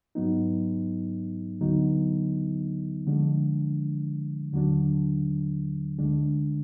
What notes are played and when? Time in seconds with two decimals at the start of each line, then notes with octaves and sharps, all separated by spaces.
0.15 G#2 F#3 B3 D#4
1.61 D2 D3 F#3 B3 D#4
3.07 D3 F3 G#3 D4
4.53 D#2 D3 F#3 D4
5.98 D2 D3 G#3 D4